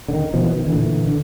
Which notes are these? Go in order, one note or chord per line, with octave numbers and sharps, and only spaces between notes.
D3
D#3
B2 F3
E3
D#3
D3 E3
A#2
D3